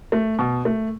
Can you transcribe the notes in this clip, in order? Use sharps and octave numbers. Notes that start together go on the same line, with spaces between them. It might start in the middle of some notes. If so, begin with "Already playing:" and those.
A3
B2
A3